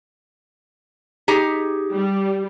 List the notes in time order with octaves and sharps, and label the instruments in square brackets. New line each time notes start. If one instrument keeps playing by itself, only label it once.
[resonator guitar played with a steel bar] D#4 G4 G#4
[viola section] G3